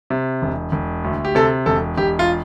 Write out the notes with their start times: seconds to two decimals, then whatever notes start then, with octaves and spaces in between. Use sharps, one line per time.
0.10 C3
0.42 E1
0.72 E1
1.04 D2
1.25 G4
1.35 C3 A4
1.66 E1 A4
1.97 E1 G4
2.19 F4